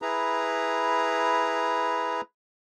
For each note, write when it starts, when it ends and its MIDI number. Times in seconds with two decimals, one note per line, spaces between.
0.02 2.21 64
0.02 2.21 68
0.02 2.21 71
0.02 2.21 82